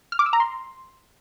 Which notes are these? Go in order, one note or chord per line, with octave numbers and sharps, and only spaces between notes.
F6
D6
E6
A#5
C6